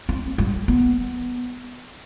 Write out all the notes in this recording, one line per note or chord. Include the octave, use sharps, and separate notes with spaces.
C4
G3
B3